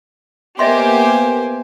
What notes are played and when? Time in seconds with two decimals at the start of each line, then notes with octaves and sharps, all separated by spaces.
0.59 A#3 B3 G4 C5 D#5 E5 G#5 C6